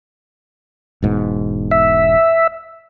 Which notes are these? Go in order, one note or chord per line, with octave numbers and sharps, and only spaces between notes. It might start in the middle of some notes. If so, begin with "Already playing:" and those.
E1 G#2 B2
E5